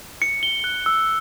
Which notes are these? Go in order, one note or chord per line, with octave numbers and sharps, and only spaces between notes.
C#7
G7
F#6
E6